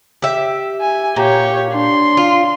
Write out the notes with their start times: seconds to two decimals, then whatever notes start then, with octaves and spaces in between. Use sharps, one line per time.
0.22 G4 E5
0.81 G#5
1.16 A#2 G4 C#5
1.71 D4 C6
2.17 F4